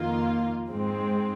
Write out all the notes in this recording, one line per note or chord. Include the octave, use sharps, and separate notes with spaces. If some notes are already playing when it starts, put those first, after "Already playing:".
Already playing: F2 D#3 A#3 F4
G#2 G#3 C4